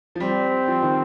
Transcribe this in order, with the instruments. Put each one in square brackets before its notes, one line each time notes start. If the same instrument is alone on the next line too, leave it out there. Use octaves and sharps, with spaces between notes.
[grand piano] F3
[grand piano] G3 [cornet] C4
[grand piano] F3
D#3